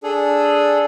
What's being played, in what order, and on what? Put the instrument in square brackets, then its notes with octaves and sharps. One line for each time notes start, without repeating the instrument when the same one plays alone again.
[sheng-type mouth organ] D4 G#4 A4